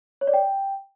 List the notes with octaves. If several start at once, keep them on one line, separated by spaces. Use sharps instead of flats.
C#5
D5
G5